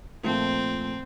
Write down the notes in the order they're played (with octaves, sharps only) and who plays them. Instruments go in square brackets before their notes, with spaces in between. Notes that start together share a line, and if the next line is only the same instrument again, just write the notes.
[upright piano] A#2 F3 A3 [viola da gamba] C4